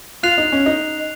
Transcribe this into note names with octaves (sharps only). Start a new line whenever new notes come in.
F4 F#6 C7 F7
D#4
C#4
D#4